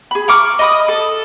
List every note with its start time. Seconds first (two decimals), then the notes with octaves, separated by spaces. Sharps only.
0.11 G#4 B5
0.28 A#5 C#6 D6 F6
0.59 D#5 B5 D#6
0.88 A4